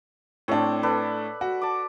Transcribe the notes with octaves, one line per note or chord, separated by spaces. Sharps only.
A2 C4 D4 C#5
A4 B4 D5
F#4
A5 D6